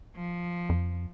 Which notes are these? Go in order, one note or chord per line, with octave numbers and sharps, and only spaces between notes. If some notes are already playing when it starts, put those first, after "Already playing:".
F3
F2